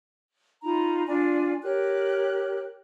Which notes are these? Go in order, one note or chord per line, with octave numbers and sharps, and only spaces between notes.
D#4 F4 A#5 B5
D4 F4 D5 G#5
G4 A#4 C#5 F#6